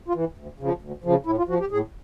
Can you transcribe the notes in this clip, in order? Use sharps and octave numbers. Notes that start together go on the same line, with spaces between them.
F4
E3
D2
C#3 F3
D2
C#3 F3
A2 E4
F4
F3 F#4
G4
A2 G#4